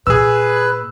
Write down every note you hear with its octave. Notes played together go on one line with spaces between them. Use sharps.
A#2 G#4 B4 E6